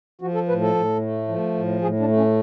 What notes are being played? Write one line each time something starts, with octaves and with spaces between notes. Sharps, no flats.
F3 F#4
A4
A2 B4
A4
A2
A3
F3
A2
A2 G#4
D4
A3
C#4